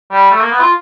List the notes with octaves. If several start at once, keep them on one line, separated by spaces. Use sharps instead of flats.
G3
A3
A#3
B3
F4